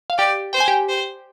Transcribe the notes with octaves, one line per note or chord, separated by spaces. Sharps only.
F5
G4 D5 G5
C5 G5
G#5
G4 G5
C5